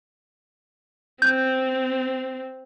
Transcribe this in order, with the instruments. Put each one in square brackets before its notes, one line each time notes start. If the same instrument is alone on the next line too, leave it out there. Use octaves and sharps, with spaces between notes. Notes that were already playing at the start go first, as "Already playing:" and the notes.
[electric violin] C4 [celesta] G6